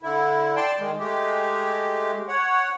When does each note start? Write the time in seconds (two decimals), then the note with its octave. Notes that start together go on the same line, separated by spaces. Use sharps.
0.03 D3 E4
0.56 D5 G5 A5 C6
0.79 D#3 G#3
0.99 G#3 A3 G4
2.28 C#5 F#5